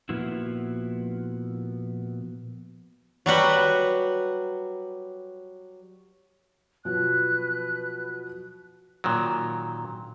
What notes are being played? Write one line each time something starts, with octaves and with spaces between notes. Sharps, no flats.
A#2 F3 A#3 B3 E4 F#4
F#3 G3 F#4 B4
B2 F3 F#3 B4 F#6
A#2 D#3 F#3